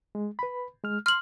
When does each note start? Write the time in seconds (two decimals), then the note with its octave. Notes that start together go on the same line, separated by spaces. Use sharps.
0.15 G#3
0.39 B4 B5
0.84 G#3 F6
1.06 C6 F6 F#7